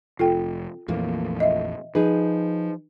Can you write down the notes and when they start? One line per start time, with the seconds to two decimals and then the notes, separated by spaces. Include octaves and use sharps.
0.19 F1 F4 A4 G5
0.88 A#1 F2 E3 A3 A#3
1.40 D#5 E5
1.95 F3 D#4 G#4 B4